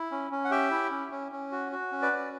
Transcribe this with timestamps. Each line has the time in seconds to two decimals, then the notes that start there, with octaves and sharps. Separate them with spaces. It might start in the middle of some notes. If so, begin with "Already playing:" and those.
Already playing: E4
0.11 C#4
0.31 C#4
0.45 F#5
0.51 G4 E5 G5
0.71 E4
0.91 C#4
1.11 C#4
1.32 C#4
1.52 F#4
1.72 F#4
1.92 C#4
2.02 B4 D5
2.12 C#4